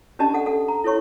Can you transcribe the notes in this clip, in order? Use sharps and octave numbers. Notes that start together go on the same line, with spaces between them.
C#4 D4 G4 D5 D#5 A5
A4 F#5
A4 F#5
A#5
E4 A4 C#5 C#6